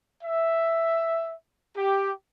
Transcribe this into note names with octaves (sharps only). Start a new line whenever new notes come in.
E5
G4